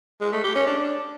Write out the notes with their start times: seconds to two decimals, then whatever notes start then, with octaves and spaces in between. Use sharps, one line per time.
0.21 G#3
0.32 A3
0.44 G4
0.55 C#4
0.67 D4